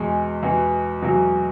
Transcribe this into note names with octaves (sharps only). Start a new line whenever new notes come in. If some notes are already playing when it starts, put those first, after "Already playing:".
Already playing: E2 B2 G#3
E2 B2
E2 B2 F#3